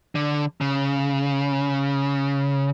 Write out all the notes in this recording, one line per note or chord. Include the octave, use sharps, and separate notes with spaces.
D3
C#3